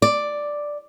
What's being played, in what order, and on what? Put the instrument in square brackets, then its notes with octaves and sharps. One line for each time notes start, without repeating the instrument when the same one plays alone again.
[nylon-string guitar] D5